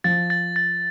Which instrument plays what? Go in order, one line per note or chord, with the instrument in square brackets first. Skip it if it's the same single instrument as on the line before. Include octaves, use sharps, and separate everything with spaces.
[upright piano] F3 [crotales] A6
[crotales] A6
A6